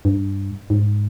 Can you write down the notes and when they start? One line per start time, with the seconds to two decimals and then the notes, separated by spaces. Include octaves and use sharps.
0.05 G2
0.70 G#2